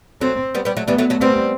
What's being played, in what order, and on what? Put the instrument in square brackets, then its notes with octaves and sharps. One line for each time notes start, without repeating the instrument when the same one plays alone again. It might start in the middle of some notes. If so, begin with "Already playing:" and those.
[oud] F#3 A3 [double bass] C4
[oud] G3 B3
G3 B3
F#3 A3
[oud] E3 G3 [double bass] B3
[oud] F#3 A3
F#3 A3
[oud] G3 B3 [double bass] C4